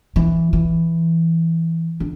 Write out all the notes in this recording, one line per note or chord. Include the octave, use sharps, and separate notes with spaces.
E3
E3
D3